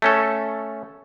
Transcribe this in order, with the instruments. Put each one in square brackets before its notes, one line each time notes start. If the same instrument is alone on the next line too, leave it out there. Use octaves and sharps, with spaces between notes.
[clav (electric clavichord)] A3 C#4 A4